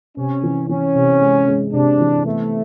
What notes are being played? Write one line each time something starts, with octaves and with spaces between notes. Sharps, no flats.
C3 C#4
E3
E3 C#4
C3
G#3
G#3
C3 D4
E3
A3 B3